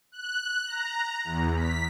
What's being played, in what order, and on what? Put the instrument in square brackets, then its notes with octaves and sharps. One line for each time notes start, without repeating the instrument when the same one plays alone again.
[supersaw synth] F#6
A#5
E2
B6